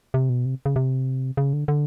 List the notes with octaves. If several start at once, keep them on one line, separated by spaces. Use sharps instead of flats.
C3
B2
C3
C#3
C3
C#3
D3
D3